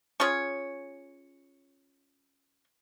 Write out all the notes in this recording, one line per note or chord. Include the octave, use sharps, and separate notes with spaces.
C#4 F4 G#4 C#5